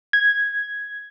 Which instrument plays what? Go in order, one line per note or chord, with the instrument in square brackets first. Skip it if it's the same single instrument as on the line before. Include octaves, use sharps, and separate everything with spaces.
[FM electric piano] G#6